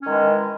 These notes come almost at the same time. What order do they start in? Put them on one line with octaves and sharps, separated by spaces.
C#4 D#3 G#3 E3